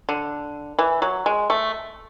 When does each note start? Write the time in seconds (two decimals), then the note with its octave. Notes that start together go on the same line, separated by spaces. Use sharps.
0.09 D3
0.79 E3
1.02 F#3
1.26 G#3
1.50 A3